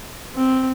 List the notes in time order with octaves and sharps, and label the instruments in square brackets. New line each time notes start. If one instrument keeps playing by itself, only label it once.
[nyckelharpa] C4